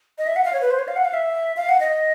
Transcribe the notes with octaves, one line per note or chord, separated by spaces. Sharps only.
D#5
E5
F#5
F5
C#5
B4
C5
C#5
F5
F#5
F5
E5
F5
F#5
D#5